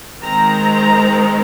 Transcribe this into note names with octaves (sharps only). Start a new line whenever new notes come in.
D#3 G#3 C4 A#5